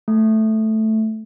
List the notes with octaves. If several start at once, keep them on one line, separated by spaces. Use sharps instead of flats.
A3